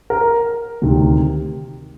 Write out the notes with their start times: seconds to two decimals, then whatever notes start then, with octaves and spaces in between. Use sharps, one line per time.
0.10 A#4
0.82 D2 C3 D#3